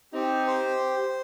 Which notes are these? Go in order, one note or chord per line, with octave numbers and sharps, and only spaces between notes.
C4 D#4 G4
C5